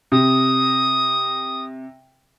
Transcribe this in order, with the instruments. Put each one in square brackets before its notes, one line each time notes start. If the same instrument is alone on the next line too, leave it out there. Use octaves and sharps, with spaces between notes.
[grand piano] C3 [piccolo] D#6